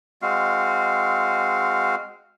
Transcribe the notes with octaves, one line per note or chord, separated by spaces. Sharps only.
G#3 C4 F#4 F5